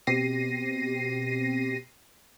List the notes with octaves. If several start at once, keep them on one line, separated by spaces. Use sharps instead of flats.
B2 C4 G4 A#6 C7 D#7